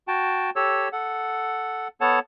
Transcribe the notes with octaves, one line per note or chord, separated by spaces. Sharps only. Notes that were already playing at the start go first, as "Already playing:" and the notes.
F#4 G5 A5
G4 A4 C#5 E6
A4 F#5
B3 A4 C#5 F#5 A5